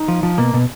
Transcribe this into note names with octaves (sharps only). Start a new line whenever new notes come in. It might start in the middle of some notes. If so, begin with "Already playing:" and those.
Already playing: D#4
F3
F3
B2 A#3
B2